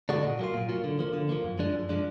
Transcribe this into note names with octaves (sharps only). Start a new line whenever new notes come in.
D3 G#3 D4 F#4
A#2
F#3 A#3 F4
A#2
F#3 A#3 F4
D3
F3 A#3
D3
F3 A#3
F#2
F3 G#3 D4
F#2
F3 G#3 D4